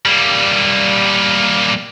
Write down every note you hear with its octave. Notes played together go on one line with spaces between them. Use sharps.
G3 A#3